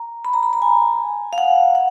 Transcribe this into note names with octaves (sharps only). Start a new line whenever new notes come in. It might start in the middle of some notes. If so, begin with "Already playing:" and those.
Already playing: A#5
B5
A#5
B5
A#5
G#5
F5
F#5
F#5